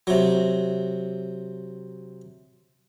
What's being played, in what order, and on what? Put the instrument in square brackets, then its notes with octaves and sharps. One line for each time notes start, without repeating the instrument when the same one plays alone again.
[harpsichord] C3 F#3